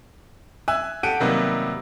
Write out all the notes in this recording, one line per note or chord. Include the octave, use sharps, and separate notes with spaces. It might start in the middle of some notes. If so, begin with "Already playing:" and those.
E5 G#5 E6 F#6
G4 A4 F#5 D7 D#7
C3 D#3 F#3 G3 A#3 B3